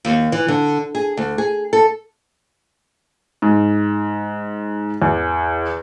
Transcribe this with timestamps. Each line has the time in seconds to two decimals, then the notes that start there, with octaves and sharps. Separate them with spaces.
0.05 D#2
0.32 E3
0.48 D3
0.95 G#4
1.17 D2
1.38 G#4
1.73 A4
3.42 G#2
5.02 E2